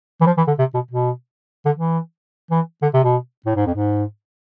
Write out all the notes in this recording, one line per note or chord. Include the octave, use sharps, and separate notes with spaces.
E3
F3
E3
D3
C3
B2
B2
D3
E3
E3
D3
C3
B2
A2
G#2
F2
G#2